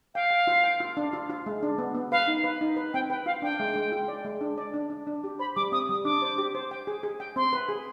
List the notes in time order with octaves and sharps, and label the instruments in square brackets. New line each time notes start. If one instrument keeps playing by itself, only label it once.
[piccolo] F5 [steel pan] G5
[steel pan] G5
F4
G5
F4
D4
F4
F4
G#3
D4
B3
B3
[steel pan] B4 [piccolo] F5
[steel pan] D#4
B4
D#4
B4
[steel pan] C4 [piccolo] G5
[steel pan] B4 [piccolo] G5
[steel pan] F4 [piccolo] F5
[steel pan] D4 [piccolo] G5
[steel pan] G#3
G#3
F4
D5
G#3
D4
D5
D4
D4
D4
G4
[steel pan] C5 [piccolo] B5
[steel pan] G3 [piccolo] D6
[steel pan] C4 [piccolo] D#6
[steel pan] G3 [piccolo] D#6
[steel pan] D4 [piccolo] D6
[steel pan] C5
G4
C5
G5
G#4
G#4
G5
[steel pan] C4 [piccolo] C6
[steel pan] B4
G#4